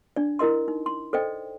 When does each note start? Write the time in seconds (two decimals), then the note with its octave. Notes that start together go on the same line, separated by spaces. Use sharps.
0.16 D4 D5
0.39 E4 A#4 D#5 C6
0.68 D#4
0.86 C6
1.13 A4 C5 D5 D#5 G5